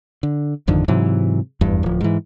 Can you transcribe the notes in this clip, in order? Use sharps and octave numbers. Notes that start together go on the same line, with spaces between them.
D3
G#1 F2 D3 D#3
G#2 C3 E3 F#3
F1 E2 G2
D1 F3
G#2 E3